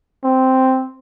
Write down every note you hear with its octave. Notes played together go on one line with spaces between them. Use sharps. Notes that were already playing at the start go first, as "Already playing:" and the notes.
C4